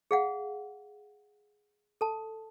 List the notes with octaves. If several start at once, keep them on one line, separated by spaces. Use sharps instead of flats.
G#4 F5 F#5
A4 A5